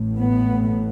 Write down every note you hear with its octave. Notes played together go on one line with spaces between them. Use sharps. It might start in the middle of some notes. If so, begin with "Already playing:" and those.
Already playing: A1 A2
B3